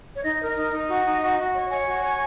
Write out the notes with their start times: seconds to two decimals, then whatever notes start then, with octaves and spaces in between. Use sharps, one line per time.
0.15 C#5
0.22 D#4 D#5
0.40 A#4
0.48 D#5
0.55 D#4
0.72 D#4 D#5
0.89 F#4
1.05 D#4
1.21 F#4
1.38 F#4
1.54 C#5
1.70 C#5 G#5
1.87 F#4
2.03 C#5